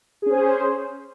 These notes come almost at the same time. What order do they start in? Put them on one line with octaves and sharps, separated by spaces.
G#4 C#4 C5